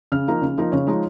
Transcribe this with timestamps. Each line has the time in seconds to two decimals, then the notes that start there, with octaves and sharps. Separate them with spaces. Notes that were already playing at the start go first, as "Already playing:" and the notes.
0.12 C#3 F6
0.28 F3 A#3 D#4
0.42 C#3
0.58 F3 A#3 D#4
0.72 C#3 C#5
0.87 F3 G#3 D#4